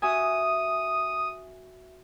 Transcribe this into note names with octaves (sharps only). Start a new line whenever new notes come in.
F#4 E5 G#5 D#6